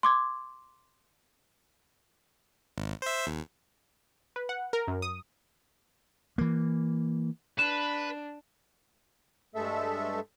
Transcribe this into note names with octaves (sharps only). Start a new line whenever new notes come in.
C6 D6 G#6
G#1
C5 E5
D#2
B4
F#5
A#4
F#2
D#6
E3 A#3
D4 B4 E7
G2 G#3 A3 A4 E5